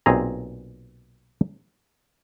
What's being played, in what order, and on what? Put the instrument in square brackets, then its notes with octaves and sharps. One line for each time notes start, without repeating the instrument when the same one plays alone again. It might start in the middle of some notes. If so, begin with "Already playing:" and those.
[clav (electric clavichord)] B1 A#2 C4 G#4 A#5